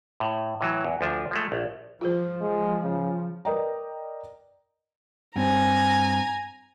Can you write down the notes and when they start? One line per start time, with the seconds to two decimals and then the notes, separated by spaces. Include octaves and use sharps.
0.20 A2
0.61 A2 E3 F#3
0.84 E2
1.01 D2 F3 D4
1.31 F3 G#3 A3
1.52 A#1
2.01 F3 F4 G#4 C5
2.41 G#3
2.83 C#3
3.45 A#4 B4 D5 D#5 G5 A#5
5.36 G2 C4 G#5 A#5